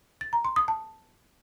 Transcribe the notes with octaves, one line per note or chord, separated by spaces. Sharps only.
A6
A#5
C6
D#6
A5